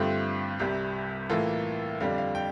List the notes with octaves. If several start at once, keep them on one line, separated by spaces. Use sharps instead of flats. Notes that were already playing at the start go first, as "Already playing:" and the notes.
Already playing: G2 D3 A3 C4 F4 G4
C2 C3 G3 G4
A2 E3 A#3 F4 A4
F2 D3 G3 D4 F5
F5
G5